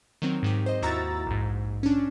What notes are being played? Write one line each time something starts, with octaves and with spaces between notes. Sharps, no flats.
D#3 F#3 C4
G#2 D#3 G4
C5 D#5
D#2 E4 F#4 A#5 E6 A6
A#1 G#2
C#4 D4